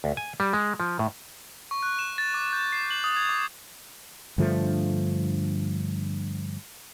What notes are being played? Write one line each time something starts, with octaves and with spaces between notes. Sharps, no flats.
D2
G#5
G3
G#3
F3
A2
C#6
F#6
E7
A6
D6
G6
C7
F#7
D#6
G#6
D6
G2 D3 F3 A3